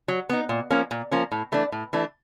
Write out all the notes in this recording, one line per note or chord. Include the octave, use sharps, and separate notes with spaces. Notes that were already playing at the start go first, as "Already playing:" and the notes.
F#3
B3 D#4
A#2
F3 A#3 C#4
A#2
F3 A#3 C#4
A2
E3 A3 D4
A2
E3 A3 D4